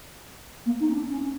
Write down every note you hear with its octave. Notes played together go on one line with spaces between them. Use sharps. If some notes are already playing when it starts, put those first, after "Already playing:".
A#3
D#4
C#4
D4
C#4